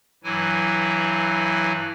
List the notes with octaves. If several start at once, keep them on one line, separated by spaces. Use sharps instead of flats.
G2 E3 F#3 E4 G#5